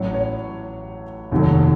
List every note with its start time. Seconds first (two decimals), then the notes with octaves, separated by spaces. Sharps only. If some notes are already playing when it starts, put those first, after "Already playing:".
Already playing: A1 A2 F#3 C#5
0.14 C#5
1.31 F1 D#2 D#3 F#3 A3